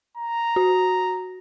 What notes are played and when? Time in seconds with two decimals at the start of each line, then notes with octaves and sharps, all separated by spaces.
0.17 A#5
0.56 F#4